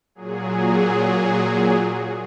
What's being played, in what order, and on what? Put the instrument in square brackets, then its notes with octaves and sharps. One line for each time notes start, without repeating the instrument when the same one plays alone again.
[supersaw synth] A#2 F#3 G#4